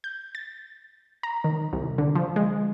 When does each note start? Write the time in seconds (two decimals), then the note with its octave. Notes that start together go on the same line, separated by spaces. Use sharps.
0.04 G6
0.35 A6
1.23 A#5
1.44 D#3
1.73 C2
1.98 D3
2.15 F3
2.36 G#3